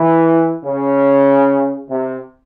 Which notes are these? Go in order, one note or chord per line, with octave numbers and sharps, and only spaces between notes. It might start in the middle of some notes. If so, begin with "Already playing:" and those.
Already playing: E3
C#3
C3